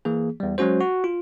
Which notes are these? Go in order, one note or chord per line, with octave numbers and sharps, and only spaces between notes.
E3 A#3 G#4
E2 G3
F#3 G#3 C#4 F#4 C5
F#4
F4